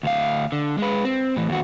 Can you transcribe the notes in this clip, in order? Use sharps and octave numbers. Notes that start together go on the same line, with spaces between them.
D2 F5
D3
G#3 B4
C4
A2 E3
D#2 F#4